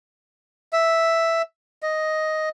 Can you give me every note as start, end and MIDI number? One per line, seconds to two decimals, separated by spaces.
0.73 1.42 76
1.83 2.49 75